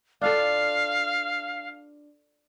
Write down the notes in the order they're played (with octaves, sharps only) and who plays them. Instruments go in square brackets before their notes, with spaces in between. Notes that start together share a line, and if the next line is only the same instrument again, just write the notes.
[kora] D4 F4 A4 [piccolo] F5